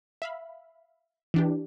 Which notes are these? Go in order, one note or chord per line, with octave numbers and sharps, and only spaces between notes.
E5 F5 B5
E3 D4 G4